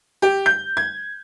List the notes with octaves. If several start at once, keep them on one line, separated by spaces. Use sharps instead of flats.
G4
G6
G#6